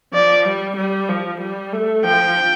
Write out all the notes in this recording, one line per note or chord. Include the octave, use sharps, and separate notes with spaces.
F3 D5
G3
G3
F3
G3
A3
F3 G5